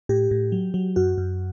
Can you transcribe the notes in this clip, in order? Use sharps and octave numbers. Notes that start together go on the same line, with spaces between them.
A2 G4
A2
F#3
F#3
F#2 F#4
F#2